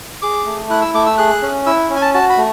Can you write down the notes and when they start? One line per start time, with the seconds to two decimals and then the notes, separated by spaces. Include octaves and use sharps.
0.22 G#4 D6
0.46 A3
0.70 E4 F#6
0.82 E6
0.94 A3 D6
1.06 E6
1.18 G#4 F#6
1.42 C#4
1.66 E4 E6
1.90 C#4
1.96 G#5
2.02 A5
2.14 F#4 A5
2.30 B5
2.38 A3